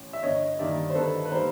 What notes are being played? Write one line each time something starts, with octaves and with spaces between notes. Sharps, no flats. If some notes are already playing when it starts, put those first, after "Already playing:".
Already playing: A1
E5
G1 C#5 D#5
G2 D#3 G3 A#3 D5 E5
C5
G1 A4 B4
B4
D#3 G3 A#3 A#4 C5